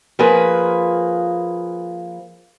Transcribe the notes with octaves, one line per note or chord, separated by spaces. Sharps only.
F3 A#3 G#4 B4